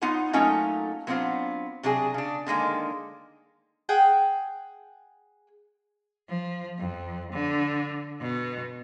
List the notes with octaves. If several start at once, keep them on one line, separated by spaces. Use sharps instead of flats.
B3 D#4 F4 C#5 F#5 A#5
F#3 A3 A#3 C#4 D#4 F4
F#3 B3 C4 D4 F4 C5
C3 F#3 D4 G4 G#4
C#3 D4
D3 D#3 G#3 A#3
G#4 F#5 G5
F3
F2
D3
B2